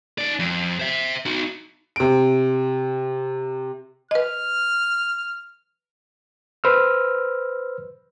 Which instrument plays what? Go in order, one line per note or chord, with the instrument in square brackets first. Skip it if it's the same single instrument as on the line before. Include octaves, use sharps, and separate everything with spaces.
[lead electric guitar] D#4 D5
F2
C5 E5
D#4 F#4
[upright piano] C3 D7
[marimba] B4 D#5 [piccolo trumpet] F6
[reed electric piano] B4 C5 E6 F6